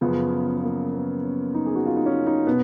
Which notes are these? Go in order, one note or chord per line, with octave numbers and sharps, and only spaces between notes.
F#2 C#3 F3 B3
B3
A#3
B3
C#4
D#4
G#4
F#4
F4
D#4
C#4
D#4
B2 B3